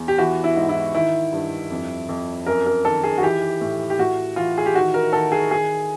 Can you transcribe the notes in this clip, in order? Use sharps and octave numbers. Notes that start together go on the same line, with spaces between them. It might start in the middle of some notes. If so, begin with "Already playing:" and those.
Already playing: E2
G4
E3 F#4
E4
G#2
E4
D#3 E4
G2
F2
F2
F#2 A#4
A#4
D#3 A4
G#4
F#4
E3 G4
A2
G4
A2 F#4
E3 F4
G#4
G4
D#3 F#4
A#4
D#3 A4
G#4
D#3 G#4